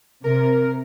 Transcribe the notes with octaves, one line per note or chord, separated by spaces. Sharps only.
C3 A#4